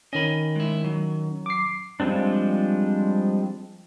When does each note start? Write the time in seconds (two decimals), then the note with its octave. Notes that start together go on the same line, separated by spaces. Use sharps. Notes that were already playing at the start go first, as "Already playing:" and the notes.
0.13 D#3 C#4 D#5 G#5 B5
0.56 G#3 E4
0.84 F#3
1.46 D6 C7
2.00 F3 G3 G#3 C4 D4